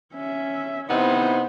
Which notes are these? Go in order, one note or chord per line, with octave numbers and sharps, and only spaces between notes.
C#4 E5
C3 B3 D#4 E4 C5